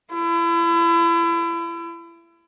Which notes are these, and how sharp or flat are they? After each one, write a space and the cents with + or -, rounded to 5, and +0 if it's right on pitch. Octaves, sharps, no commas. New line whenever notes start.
E4 +35